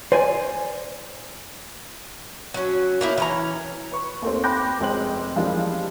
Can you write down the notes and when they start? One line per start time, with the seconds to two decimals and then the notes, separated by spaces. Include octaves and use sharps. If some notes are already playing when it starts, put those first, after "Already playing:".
0.12 C5 D5 G#5
2.54 F#3 C#4
3.01 A#3 D#4 E4
3.18 E3 C#4 A#5
3.92 B4 C#6
4.22 D#2 A3 C4
4.44 G5 B5 D6 F#6 G6 A#6
4.80 F1 G#3 C4 G5 F#7
5.36 E3 F3 G3 G#3 A#3 D4